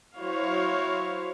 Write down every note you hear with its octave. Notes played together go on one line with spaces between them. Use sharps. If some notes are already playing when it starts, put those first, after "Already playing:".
F#3 E4 F#4 C5 C#5 F5